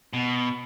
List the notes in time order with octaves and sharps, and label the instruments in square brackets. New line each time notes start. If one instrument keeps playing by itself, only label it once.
[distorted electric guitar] B2